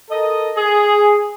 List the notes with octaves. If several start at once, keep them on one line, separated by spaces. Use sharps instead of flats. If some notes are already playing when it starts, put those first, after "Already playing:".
A4 A#4 D#5
G#4